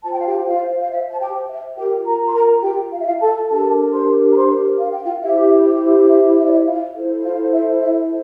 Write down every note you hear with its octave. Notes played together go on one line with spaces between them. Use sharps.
F4 C5 A5
G5
F5
G4 G5
F4 F5
F5
E5
A5
G4 G5
E5
F4 G4 A#4 G5
A#4 A#5
C6
A#4 A#5
G4 G5
F5
E5
F4 F5
A4 A5
D4 G4 A4 A#4 A5
C5 C6
A#5
C5 C6
F5
G5
F4 F5
E4 G4 C5 E5
E5
E5
D5
E5
F4 F5
E4 A4 C5
F4 F5
E5
E5